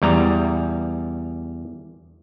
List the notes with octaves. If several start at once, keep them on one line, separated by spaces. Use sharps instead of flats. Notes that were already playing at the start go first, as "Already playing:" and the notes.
E2 G3 A#5